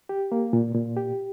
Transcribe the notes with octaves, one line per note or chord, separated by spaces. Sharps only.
G4
A#3
A#2
A#2
G4